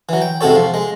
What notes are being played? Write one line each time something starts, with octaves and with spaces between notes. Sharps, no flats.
E3 F#3
G5
G#2 C3 F#4 A4 C#5
F3
G#3